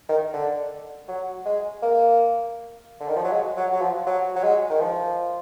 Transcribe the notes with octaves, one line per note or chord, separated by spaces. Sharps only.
D#3
D3
F#3
G#3
A#3
D3
D#3
F3
F#3
G#3
F#3
F#3
F3
F#3
F#3
G#3
D#3
F3